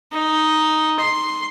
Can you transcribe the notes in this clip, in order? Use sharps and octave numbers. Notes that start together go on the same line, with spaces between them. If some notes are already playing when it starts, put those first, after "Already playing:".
D#4
C6